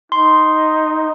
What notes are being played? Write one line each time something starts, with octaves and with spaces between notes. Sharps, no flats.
D#4 C6